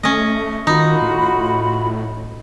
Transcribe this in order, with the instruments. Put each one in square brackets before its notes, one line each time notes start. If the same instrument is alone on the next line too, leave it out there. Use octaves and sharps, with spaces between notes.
[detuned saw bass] A3 [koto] C#4 D#5
[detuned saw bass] D#3 [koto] D#4 [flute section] F4 F#4 B5
[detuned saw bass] A2